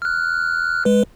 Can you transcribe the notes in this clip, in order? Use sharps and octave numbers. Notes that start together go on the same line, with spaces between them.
F6 F#6
G#3 B4